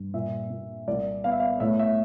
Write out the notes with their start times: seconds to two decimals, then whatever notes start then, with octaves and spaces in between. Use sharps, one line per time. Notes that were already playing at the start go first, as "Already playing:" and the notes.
Already playing: G2
0.14 A#2 E5
0.50 A#2
0.88 C2 D5
1.24 B3 F5
1.32 E5
1.40 F5
1.60 A2 E5
1.79 E5